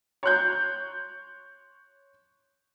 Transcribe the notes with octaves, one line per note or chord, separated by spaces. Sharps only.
C#5 C6 F#6 G6